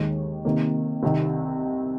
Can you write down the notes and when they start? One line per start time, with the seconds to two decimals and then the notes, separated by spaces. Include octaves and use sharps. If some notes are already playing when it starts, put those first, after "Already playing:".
Already playing: D#2 D#3 G#3
0.45 C3 D#3 A#3
1.03 C2 C3 D#3